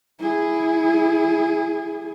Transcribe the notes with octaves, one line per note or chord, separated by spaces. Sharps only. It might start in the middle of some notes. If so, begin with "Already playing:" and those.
E4 G#4